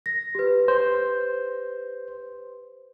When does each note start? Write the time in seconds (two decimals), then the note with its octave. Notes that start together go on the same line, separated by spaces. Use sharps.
0.06 A#6
0.35 G4 B4
0.68 C5